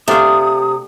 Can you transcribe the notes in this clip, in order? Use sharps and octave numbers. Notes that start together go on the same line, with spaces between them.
C3 A3 D4 F4 E5 D#6